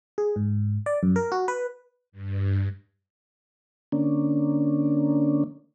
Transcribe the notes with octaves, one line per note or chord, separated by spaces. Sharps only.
G#4
G#2
D5
F#2
A#4
F#4
B4
G2
D3 A#3 C#4 D4